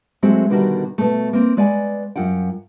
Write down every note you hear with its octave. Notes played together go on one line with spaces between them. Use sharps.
F#3 G#3 A3 C4 F#4 G#4
B2 D3 D#3 G3 F#4 A#4
B2 A3
A#3 C4
G#3 B4 D5 F#5 G#5
F#2 F4 F#5 G5